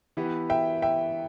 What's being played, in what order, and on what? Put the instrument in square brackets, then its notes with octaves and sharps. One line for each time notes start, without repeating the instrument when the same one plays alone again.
[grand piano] E3 B3 E4 G4
[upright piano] E5 G5
E5 G5